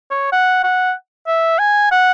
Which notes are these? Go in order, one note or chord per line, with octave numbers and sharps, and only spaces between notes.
C#5
F#5
F#5
E5
G#5
F#5